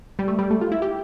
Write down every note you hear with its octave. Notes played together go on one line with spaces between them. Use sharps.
G3
A3
G3
A3
F4
E4
G4